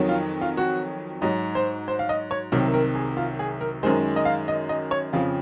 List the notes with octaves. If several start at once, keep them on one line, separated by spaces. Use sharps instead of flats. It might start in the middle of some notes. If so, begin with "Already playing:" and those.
Already playing: F2 D#3 F#3
F4
F4
F#4
G#2 F#3 D#5
C5
C5
F5
D#5
C#5
C2 C3 D#3 F#3 A#4
A#4
G#4
F4
G#4
A#4
F#2 D#3 G#3 C5
D#5
F5
D#5
D#5
C#5
F2 C#3 F3 F5